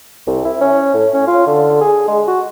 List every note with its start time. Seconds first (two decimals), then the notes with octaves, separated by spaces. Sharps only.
0.27 C2
0.45 E4
0.61 C#4
0.94 A2
1.14 C#4
1.27 F4
1.47 D3
1.81 G#4
2.08 G#3
2.28 F#4